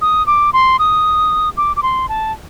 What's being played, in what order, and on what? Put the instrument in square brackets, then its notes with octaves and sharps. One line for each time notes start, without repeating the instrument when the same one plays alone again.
[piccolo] D#6
D6
C6
D#6
D6
D6
C6
A5